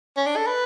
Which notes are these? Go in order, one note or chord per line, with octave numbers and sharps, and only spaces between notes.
C#4
D4
A4
B4